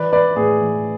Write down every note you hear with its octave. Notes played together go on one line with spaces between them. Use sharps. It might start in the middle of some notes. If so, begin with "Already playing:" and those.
Already playing: E3 B4 D5
E3 B4 D5
A2 G#4 B4
E3